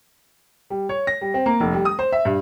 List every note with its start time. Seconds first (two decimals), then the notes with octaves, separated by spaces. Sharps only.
0.70 G3
0.89 C#5
1.07 A#6
1.21 G3
1.34 C4
1.46 A#3
1.60 F1
1.73 G3
1.85 D#6
1.99 C5
2.12 E5
2.25 G2